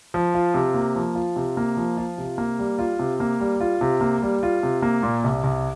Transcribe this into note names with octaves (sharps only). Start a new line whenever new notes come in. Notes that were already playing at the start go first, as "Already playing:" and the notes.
F3
F4
C3
A#3
F3
F4
C3
A#3
F3
F4
C3
A#3
G3
F4
C3
A#3
G3
F4
C3
A#3
G3
F4
C3
A#3
A#2
C2
C2